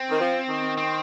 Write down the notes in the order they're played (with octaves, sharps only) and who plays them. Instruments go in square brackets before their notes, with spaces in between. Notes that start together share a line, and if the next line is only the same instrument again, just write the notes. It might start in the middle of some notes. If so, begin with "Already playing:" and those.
Already playing: [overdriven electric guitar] C4
[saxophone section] D#3
F3
D#3
[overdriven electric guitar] C4